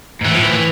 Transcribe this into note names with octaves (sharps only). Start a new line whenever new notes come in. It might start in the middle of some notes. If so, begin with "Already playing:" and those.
G#2
A2 E3
F3
E3
E3